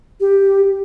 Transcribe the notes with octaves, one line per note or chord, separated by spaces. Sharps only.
G4